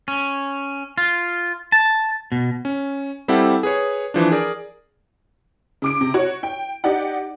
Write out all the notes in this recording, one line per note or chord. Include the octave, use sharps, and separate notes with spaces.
C#4
F4
A5
B2
C#4
G3 C4 E4 G4 A4 F#5
G#4 B4 C#5
E3 F3 D4
G#4 A#4 D5
C#3 D6 D7
C3
F#4 C#5
G5
D#4 G4 D5 F#5